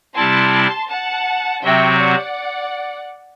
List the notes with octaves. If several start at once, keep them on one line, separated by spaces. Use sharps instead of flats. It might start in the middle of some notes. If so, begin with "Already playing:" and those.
C3 G3 C4 E4 A5 C6
F#5 A5
C3 F#3 C4 F#4 E5 G5
D5 F#5